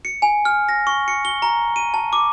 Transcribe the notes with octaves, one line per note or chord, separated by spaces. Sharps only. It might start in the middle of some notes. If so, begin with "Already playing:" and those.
C#7
G#5
F6
A#6
C#6
C#7
G7
A#5
D#7
A5
D6